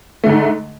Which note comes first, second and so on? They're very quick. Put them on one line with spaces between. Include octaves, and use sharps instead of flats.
A3 D3 G#2